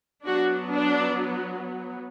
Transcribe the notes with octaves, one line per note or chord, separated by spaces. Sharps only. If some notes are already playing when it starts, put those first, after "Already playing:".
F#3 B3 D4 F#4
D4